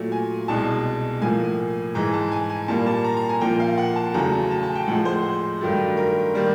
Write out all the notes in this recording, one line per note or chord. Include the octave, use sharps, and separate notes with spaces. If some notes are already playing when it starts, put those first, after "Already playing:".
Already playing: A#2 F#3 A3
G#5
C2 B2 G#3 A5
A2 F3 A#3 G#5
G#2 E3 G#3 A#5
A5
G#5
G#5
A#2 G3 A#3 A5
A5
A#5
A#5
G#5
A#2 F3 A#3 G5
F5
F#5
A5
E2 C#3 F#3 A3 A#5
A5
A5
A5
G5
A2 F3 G#3 F#5
C5
G2 D#3 F#3 A3
A#4
D#3 G3 A#3